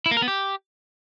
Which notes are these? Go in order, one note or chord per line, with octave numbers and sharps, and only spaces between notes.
E4
A#3
A#4
B3
G4